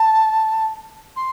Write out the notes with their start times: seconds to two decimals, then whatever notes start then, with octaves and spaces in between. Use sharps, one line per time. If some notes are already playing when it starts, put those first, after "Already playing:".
Already playing: A5
1.16 C6